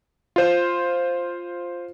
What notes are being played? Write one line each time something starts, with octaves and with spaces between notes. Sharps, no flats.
F4 C5